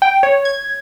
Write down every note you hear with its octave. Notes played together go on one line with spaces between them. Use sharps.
G5
C#5
G#6